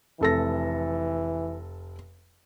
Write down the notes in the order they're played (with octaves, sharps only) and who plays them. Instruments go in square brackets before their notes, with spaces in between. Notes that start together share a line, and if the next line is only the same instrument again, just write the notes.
[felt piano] F1 A4 A#6 [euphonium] E3